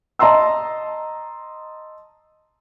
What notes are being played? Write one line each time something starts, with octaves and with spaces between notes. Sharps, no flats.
D#5 A5 A#5 C6 E6